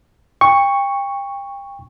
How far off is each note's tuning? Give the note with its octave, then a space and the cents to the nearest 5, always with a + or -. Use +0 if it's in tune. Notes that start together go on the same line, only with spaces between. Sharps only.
G5 +30 C#6 +0